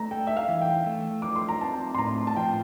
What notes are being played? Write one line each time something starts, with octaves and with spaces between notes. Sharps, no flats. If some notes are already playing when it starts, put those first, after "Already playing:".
Already playing: A3 A#5
A4 G5
E5
F5
E3
G5
A3
F3 D6
C6
A#5
C4 A5
C6
A2 A#5
A5
F3 G5